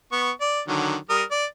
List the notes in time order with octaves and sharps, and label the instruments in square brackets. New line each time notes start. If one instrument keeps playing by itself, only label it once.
[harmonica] B3 C#6
D5
D3 D#3 F#3
G3 A#4 D#6
D5